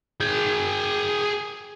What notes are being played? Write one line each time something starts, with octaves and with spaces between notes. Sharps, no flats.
G#4 G5